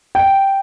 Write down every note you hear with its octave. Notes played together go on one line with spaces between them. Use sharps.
G5